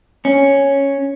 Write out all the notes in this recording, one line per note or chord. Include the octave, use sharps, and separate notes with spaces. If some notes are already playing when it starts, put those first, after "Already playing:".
C#4